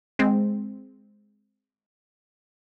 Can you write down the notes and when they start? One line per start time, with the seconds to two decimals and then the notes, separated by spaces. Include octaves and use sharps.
0.19 G#3 C4